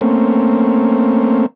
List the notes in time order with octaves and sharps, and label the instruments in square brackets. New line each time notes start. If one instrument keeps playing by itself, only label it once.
[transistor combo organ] A3 A#3 C4 C#4